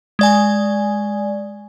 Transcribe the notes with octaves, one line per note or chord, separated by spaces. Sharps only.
G#3 D5 G#5